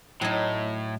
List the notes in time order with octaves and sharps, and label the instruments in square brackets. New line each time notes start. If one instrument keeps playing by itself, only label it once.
[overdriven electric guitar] A2 [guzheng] F#3 D#4